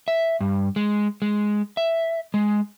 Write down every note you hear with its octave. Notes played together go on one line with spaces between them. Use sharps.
E5
G2
G#3
G#3
E5
G#3